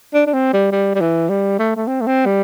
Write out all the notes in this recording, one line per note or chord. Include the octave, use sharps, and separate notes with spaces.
D4
D4
C4
G3
G3
G3
E3
G3
A3
A3
C4
A3
C4
G3